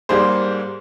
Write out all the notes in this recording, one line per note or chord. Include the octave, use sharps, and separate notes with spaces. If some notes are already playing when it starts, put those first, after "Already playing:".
G#2 G3 A#3 G#4 C5